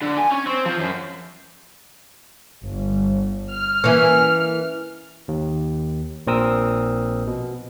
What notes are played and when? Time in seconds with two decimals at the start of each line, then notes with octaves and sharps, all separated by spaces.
0.01 D3
0.18 G#5
0.32 C#4
0.47 C4
0.66 F3
0.80 F#2
2.62 G1
3.51 F6
3.84 E3 A#3 C#4
5.28 D#2
6.27 A#1 A#2 C4 A#4 D#6 E6
7.27 B2